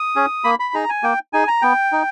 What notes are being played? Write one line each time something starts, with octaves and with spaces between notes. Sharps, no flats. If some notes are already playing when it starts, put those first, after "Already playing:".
Already playing: D#6
C#4 G#4
A#3 B5
B5
D#4 G#4 A#5
G#5
A#3 G5
D#4 G#4 G#5
A#5
B3 G5
D#4